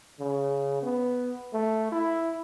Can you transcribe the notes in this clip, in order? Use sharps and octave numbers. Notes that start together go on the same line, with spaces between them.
C#3
B3
A3
E4